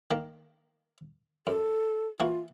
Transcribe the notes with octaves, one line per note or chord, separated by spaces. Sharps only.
D#3 A#3 A#5
F#2 A4
E3 A#3 F4 F#4